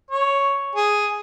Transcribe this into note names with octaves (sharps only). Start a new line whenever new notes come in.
C#5
G#4